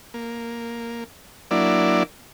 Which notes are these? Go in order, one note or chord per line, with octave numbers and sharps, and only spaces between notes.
A#3
F#3 A#3 D4 E4 D5